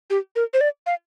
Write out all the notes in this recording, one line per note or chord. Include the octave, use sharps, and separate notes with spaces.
G4
A#4
C5
D5
F5